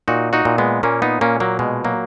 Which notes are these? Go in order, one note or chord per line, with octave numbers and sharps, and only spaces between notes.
A#2 D#4 F#4
D#4 F#4
A#2
G#3 B3
A#2 A#3 C#4
B3 D#4
A#2 A#3 C#4
F#3 A#3
B2 G#3
F#3 A#3